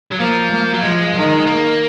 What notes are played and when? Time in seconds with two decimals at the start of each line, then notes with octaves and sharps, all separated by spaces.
0.11 F#3
0.19 F3 A#3
0.51 A#3
0.74 F#3
0.83 F3 G#3
1.16 D#3
1.47 A#3